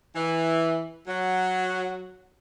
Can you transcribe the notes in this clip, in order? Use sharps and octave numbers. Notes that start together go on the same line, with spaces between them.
E3
F#3